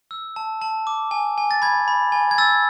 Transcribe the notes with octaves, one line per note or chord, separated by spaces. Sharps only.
E6
A5
A5
D6
G#5
G#5
A6
B5 G#6
B5
G#5
G#6
E6 A6